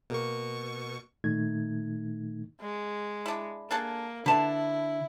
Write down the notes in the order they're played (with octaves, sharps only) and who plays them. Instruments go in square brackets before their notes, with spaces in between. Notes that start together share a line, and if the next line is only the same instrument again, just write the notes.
[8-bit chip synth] B2 C#6 [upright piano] A#3
[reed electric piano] A#2 D#3 A3 D#4 G#6
[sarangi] G#3
[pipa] D4 E4
[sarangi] A#3 [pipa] D4 G#4 A4
[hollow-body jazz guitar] D3 [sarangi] E4 [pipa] B4 A5